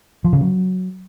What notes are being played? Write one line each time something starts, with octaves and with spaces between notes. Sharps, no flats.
F3
C#3
F#3